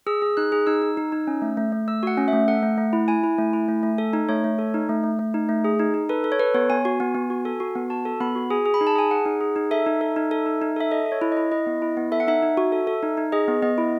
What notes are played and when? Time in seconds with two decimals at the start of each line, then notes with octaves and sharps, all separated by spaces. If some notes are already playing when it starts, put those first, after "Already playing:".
0.07 G#4 E6
0.22 G#4
0.37 D#4 F#6
0.52 G#4
0.67 D#4 E6
0.82 D#4
0.97 D#4
1.12 D#4
1.27 C#4
1.42 A3
1.57 A3
1.72 A3
1.88 A3 E6
2.03 F#4 F#5
2.17 C#4
2.28 A3 E5
2.48 A4 F#5
2.63 A3
2.78 A3
2.93 E4
3.08 E4 G#5
3.23 E4
3.38 A3
3.53 E4
3.68 A3
3.83 A3
3.98 A4
4.13 D#4
4.29 A3 C#5
4.44 A3
4.59 A4
4.74 D#4
4.89 A3
5.04 A3
5.19 A3
5.34 D#4
5.49 A3
5.64 G#4
5.79 D#4
5.94 D#4
6.09 A4 B4
6.24 A4
6.32 C#5
6.39 A4 B4
6.54 B3 C#5
6.70 B3 G#5
6.85 F#4
7.00 B3
7.15 B3
7.30 F#4
7.45 A4
7.60 F#4
7.75 B3
7.90 F#4 A5
8.05 A4
8.21 B3 B5
8.35 F#4
8.50 G#4 G#5
8.66 G#4
8.74 B5
8.81 D#4
8.87 A5
8.95 G#4 G#5
9.11 G#4 F#5
9.26 D#4
9.41 G#4
9.56 D#4
9.71 A4 E5
9.86 D#4
10.01 A4
10.16 D#4
10.31 A4
10.46 D#4
10.62 D#4
10.76 A4 E5
10.91 A4 D#5
11.06 A4
11.12 C#5
11.21 E4
11.32 E4 D#5
11.51 E4 D#5
11.67 B3
11.82 E4
11.97 B3
12.12 A4 E5
12.20 F#5
12.28 D#4 E5
12.43 D#4
12.57 F#4
12.72 A4
12.87 A4
13.03 D#4
13.17 D#4
13.32 G#4 D#5
13.48 B3
13.62 B3 D#5
13.78 E4